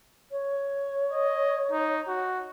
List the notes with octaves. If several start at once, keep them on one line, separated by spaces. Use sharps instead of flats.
C#5
D#5
D#4
F#4